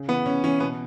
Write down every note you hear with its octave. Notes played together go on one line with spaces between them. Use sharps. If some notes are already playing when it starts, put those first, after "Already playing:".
Already playing: C#3
E3 B3
C#3 C#4
E3 C#4
B2 B3